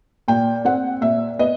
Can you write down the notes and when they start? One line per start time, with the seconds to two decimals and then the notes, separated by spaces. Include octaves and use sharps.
0.28 A#2 G5
0.65 C4 F#5
1.01 A#2 E5
1.39 B3 D#5